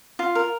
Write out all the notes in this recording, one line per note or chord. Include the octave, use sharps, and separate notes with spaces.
F4
A#4